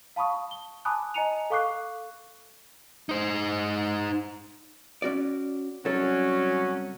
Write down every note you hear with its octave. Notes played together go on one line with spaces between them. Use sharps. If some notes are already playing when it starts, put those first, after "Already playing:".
F5 A5 B5 C#6 D#6
G7
G#5 A5 B5 D6 D#6 F#6
D#5 G#5 A#5 C#7 D#7 F7
A4 F5 C#6 D6 F#6 C7
D#4 C5
C#4 F#4 D5
C2 F#3 C#4 A4